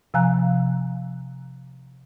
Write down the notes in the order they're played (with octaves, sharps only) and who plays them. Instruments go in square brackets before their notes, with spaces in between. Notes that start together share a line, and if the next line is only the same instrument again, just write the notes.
[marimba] C3 F3 F5 G#5 A#5 F#6